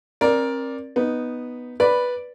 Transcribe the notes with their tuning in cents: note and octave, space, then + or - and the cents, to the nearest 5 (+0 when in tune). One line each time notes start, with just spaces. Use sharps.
C4 +40 A#4 +15 D5 +0
B3 +0 D#4 +0
B4 -5 D5 +0 B5 +0